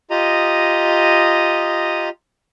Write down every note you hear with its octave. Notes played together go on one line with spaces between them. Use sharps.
F4 G4 D#5 A#5 D#6